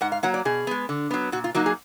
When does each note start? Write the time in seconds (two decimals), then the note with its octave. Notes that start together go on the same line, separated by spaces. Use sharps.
0.01 G#2 F#5
0.12 F5
0.23 F#3 A#3 F#5
0.34 D5
0.45 B2 G#4
0.67 G#3 B3
0.89 D3
1.11 F#3 B3
1.32 A#2 F#4
1.44 F4
1.55 F#3 A#3 D#4 F#4
1.66 G#4